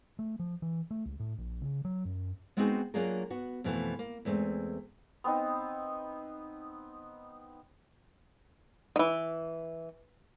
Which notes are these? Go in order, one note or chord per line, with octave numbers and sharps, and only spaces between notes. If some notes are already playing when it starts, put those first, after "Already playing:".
A3
F3
E3
A3
C#2
A2
A#1
C#3
F#3
F#2
G#3 B3 C4 D#4 F#4 G#4
F#3 A#3 D4 F4 G#4 A#4
B3 F#4
F2 B2 E3 G3 A3 B3
A#3
E2 G#3 A3 C4
B3 C4 D#4
D#3 E3